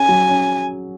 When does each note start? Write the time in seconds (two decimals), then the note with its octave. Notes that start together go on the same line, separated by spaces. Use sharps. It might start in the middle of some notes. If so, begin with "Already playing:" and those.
Already playing: C#4 G#4 G#5
0.09 F#3
0.28 C#4